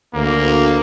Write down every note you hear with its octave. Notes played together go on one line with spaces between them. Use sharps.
D2 A#3